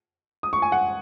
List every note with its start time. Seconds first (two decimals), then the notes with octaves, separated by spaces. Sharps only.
0.43 D#6
0.53 C#6
0.62 G#5
0.72 F#5